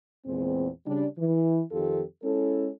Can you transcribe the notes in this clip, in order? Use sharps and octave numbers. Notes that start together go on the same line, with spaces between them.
E2 A#2 G#3 C4
C#3 G3 D4
E3
F2 D#3 C4 F4 G4 A4
G#3 C#4 E4 A4